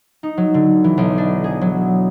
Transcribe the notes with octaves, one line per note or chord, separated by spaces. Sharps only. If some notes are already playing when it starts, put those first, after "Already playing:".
D#4
F#3
D3
E3
B1
D4
G#4
F#3